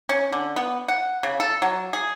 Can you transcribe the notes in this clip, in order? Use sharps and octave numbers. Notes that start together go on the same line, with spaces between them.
C#4
D3
B3
F#5
C#3
A4
F#3
G#4